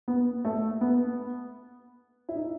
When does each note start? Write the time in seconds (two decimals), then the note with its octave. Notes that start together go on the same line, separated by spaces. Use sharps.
0.08 B3
0.45 A3
0.81 B3
2.29 E4
2.36 D#4